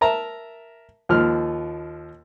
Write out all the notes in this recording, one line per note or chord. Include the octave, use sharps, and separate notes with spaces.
A#4 E5 A5 A#5
D#2 F3 F6